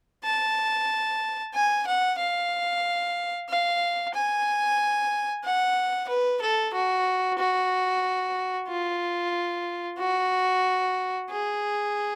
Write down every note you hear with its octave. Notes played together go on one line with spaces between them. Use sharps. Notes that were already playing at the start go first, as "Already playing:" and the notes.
A5
G#5
F#5
F5
F5
G#5
F#5
B4
A4
F#4
F#4
F4
F#4
G#4